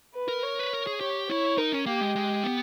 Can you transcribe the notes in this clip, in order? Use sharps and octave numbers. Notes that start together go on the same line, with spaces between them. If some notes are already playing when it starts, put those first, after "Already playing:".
B4
A#4
C#5
B4
A#4
G#4
G4 C#5
E4 C#5
D#4 A#4
C#4
A#3 G4
G#3
G#3
B3